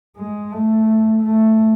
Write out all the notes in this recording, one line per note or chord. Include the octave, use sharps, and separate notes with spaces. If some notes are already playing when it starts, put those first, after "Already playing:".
G#3
A3
A3